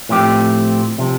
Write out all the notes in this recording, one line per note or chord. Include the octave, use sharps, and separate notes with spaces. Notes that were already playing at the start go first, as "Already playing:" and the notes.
A2 F3 C4 G4
C3 F3